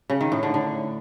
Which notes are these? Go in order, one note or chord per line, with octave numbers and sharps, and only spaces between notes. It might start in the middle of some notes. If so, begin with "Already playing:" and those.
C#3
D#3
A2
D3
D3